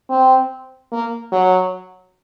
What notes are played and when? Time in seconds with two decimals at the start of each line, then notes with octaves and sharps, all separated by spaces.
0.10 C4
0.92 A#3
1.32 F#3